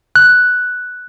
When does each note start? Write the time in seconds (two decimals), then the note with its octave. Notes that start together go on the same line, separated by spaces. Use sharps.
0.16 F#6